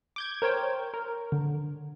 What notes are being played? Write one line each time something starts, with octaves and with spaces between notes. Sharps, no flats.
D6 G6 G#6
A#4 C5 C#5 G5
A#4
D3